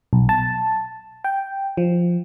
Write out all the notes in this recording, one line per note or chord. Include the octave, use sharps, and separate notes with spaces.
B1
A5
G5
F3